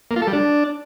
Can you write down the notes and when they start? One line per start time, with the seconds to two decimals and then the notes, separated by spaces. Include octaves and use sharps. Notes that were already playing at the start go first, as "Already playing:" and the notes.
0.11 A#3
0.16 F4
0.22 A4
0.27 G3
0.33 D4